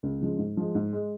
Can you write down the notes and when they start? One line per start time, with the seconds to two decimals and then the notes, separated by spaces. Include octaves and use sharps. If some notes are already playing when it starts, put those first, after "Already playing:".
0.03 C#2
0.21 C#3 F3 G#3
0.38 G#2
0.57 F3 G#3
0.75 G#2
0.93 G#3